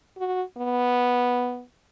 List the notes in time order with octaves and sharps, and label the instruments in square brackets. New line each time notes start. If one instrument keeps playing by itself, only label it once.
[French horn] F#4
B3